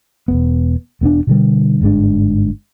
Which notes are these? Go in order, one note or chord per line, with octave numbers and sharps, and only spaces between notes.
E1 E2 B3
E1 B3 C4 D4
B2 D3 G3
G1 G#2 G#3 D4